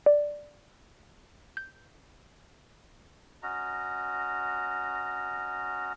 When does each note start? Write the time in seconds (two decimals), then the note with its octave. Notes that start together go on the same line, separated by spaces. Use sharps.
0.06 D5
1.57 G6
3.43 C#4 F#4 D#5 A#5